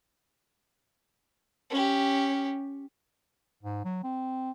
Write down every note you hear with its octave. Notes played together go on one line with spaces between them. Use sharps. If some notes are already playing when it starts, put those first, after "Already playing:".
C#4 G4
G#2
F#3
C4